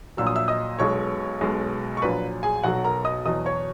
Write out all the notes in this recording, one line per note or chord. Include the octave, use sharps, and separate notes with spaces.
A#1 A#2 F#3 E6
D#6
E5 E6
D#5 D#6
B1 B2 G#3 C#5 C#6
B1 B2 G#3
C#6
A#1 A#2 F#3 B4 B5
G#4 G#5
B1 B2 F#3 F#4 F#5
A#4 A#5
D#5 D#6
E2 B2 F#3 D#5 D#6
C#5 C#6